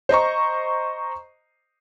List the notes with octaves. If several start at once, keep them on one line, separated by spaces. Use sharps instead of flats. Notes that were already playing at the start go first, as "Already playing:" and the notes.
C5 D#5 A#5 C#6